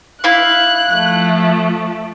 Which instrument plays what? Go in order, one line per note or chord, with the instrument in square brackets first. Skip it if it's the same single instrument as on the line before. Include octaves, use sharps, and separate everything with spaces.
[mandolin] E4 F5 [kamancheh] F#6
[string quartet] F3 A3